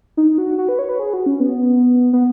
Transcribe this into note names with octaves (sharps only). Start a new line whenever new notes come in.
D#4
F#4
F#4
B4
C#5
B4
G#4
F#4
C#4
B3
B3